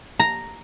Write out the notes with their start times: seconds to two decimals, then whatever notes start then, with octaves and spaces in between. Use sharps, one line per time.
0.19 A#5